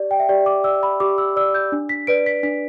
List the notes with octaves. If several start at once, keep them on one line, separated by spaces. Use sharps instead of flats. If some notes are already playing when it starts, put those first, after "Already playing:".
Already playing: G4 D5
G5
E5
G4 D5
D6
D5 E6
B5
G4 D6
E6
D5 E6
G6
D4
B6
B4 D5 D7
B6
D4 B6